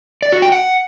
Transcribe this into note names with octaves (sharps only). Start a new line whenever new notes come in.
D5
F#4
G5
F#5